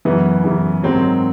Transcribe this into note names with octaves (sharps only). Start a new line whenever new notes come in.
F#2 C#3 E3 B3
F#2 C#3 E3
G#2 D#3 F#3 C4